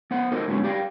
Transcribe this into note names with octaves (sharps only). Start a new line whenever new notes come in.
B3 C5 F#5
D#4 F#4 A4 A#4 C5 D#5
A2 D3 G#3 B3 C#4
G4 D5 F5 G5